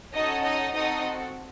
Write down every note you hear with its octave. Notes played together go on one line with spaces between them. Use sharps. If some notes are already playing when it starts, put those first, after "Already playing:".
C#4 D#4 F#4 A4 D#5
D#4 D#5
C4 D#4 F#4 A4 D#5